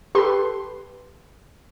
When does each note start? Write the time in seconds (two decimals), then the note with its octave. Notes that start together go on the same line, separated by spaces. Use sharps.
0.15 G4 A4 B4 C6